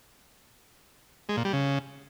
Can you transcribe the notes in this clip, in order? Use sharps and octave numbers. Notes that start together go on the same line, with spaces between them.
G#3
A#2
G3
C#3